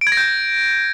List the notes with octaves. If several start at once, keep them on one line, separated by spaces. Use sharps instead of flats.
D7
G#6
A#6
G6